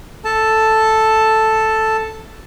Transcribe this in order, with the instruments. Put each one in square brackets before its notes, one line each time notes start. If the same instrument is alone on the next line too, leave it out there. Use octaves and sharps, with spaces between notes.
[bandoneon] A4 A5